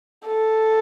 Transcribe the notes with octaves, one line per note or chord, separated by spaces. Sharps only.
A4